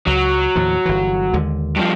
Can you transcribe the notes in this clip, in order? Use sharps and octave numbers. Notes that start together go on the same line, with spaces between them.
C#2 F#3
D#2 A2 F3
G1 E3
D#2 D3 G#3
G2 F3